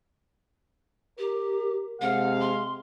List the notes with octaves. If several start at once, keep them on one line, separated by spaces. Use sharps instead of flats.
G4 A#4
C3 G#3 C4 F5 F#5
C6